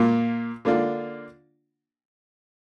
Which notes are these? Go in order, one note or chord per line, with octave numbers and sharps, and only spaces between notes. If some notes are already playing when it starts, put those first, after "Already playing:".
Already playing: A#2 A#3 F4
D3 A#3 D4 F4